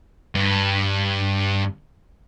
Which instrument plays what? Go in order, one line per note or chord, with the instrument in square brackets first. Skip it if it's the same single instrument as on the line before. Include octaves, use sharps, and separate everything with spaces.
[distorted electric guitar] G2